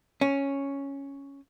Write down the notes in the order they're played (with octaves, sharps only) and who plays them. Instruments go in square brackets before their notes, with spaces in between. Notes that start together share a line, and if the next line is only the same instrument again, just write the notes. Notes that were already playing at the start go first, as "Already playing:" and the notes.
[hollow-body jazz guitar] C#4